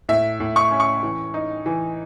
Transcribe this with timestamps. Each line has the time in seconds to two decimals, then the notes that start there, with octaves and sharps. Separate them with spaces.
0.09 A2 E5
0.40 A2
0.56 C#6
0.71 C#4
0.80 C#6
1.03 E3
1.34 D#4
1.66 E3